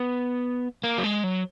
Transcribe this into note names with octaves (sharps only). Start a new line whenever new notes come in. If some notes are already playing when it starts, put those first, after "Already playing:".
Already playing: B3
A#3
F#3
G#3
F#3